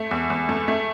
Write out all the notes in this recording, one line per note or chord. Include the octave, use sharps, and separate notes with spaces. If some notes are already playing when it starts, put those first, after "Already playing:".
Already playing: A3
E2
E2
A3
A3